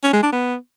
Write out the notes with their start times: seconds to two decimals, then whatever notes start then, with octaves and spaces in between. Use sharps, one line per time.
0.04 C#4
0.13 G#3
0.23 D4
0.33 B3